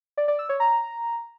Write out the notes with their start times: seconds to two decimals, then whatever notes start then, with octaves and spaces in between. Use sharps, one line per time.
0.18 D5
0.28 D5
0.39 E6
0.49 C#5
0.60 A#5